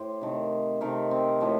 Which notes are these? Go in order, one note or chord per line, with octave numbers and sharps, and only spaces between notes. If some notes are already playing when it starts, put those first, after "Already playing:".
Already playing: A2 G4 C5
C3 D#3 A3
C3 D#3 A3 A#4
C4
A2 F3 A3 A#3